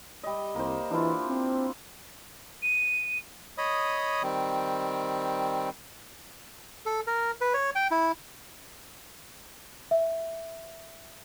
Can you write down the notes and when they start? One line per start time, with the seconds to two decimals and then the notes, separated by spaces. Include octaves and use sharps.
0.23 G3 D#5
0.55 C2 A#3 C5
0.91 E3 D4 E4 F4
1.28 C4
2.63 D#7
3.58 C#5 D#5 B5 D#6
4.23 D#3 G3 C4
6.86 A4
7.07 A#4
7.41 B4
7.54 C#5
7.75 G5
7.91 E4
9.91 E5